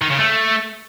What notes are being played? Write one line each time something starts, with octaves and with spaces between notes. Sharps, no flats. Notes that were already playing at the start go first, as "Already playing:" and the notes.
D#3
C#3
A3